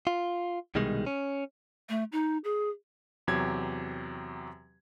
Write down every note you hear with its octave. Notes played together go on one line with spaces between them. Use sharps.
F4
C2 B2 D#3 G3 G#3
C#4
A3
D#4
G#4
E2 C3 F#3 G4 G#6